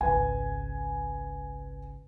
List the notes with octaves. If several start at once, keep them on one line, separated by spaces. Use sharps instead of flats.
G#1 C#2 B4 G#5